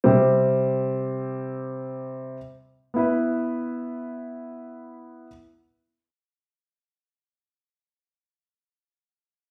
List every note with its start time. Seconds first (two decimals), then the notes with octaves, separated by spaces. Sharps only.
0.04 C3 G3 C4
2.94 B3 E4 B4